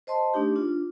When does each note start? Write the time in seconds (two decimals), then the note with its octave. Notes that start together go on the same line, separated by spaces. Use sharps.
0.07 C5 D#5 A5 C6
0.34 A3 D4 D#4 G4
0.55 D4 F4